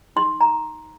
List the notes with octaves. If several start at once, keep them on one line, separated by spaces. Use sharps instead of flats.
D#4 C6
A#5